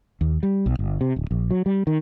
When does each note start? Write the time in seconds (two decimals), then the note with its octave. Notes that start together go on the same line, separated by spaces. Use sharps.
0.21 D#2
0.43 G3
0.66 B1
0.79 G1
1.01 C3
1.16 D1
1.31 A#1
1.51 F#3
1.66 G3
1.87 D#3